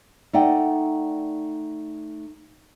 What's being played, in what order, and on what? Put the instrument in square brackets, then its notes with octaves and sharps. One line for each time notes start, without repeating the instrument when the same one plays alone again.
[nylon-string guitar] A3 D#4 D5 F#5 G5